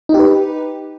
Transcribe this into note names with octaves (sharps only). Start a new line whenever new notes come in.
D#4 G4 B4